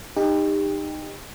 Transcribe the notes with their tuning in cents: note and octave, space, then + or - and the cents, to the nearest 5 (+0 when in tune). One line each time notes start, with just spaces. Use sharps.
D#4 -15 G4 +25